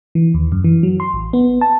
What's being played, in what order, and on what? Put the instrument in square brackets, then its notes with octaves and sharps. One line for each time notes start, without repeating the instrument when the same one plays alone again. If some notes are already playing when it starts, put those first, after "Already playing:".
[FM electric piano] E3
D#2
F#2
E3
F#3
C6
A1
B3
A5